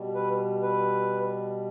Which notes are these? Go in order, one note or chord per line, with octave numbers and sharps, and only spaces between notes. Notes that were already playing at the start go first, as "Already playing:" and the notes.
Already playing: B2 G3
B4
B4